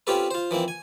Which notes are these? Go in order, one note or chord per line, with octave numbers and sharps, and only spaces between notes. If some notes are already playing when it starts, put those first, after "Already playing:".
C4 C#4 F4 G4 A4 B4
F4 C5
E3 F3 A#3 C4
G#5